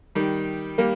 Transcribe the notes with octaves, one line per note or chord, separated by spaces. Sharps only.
D#3 G3
G3 A#3